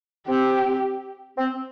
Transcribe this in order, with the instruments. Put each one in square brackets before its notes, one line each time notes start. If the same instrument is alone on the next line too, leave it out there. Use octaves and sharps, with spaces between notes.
[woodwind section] C4 [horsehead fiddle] G4
[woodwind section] C4